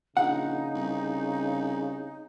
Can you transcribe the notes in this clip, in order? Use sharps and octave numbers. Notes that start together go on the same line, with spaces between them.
A#1 C#3 D#4 F#5
C2